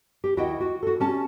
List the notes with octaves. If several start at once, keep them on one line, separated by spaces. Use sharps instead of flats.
G4
D#2 E4 F#4 D#5 F#5 G5
F#4
F#4 A4
G3 C#4 A5